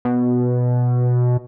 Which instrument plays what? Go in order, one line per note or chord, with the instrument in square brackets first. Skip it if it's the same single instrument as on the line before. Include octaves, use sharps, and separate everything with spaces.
[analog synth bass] B2